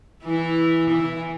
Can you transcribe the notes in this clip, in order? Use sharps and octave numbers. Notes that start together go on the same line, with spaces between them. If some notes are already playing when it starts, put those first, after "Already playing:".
E3 E4
E3 E4